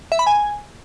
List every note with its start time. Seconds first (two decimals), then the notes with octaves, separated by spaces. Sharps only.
0.12 E5
0.19 B5
0.27 G#5